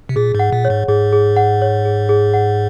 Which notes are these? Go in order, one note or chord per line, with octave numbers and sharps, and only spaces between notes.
C3
A#2 G#4
G#2 F#5
A#2
C#5
G#2
G#2 G#4
G#4
F#5
C#5
G#4
G#4
F#5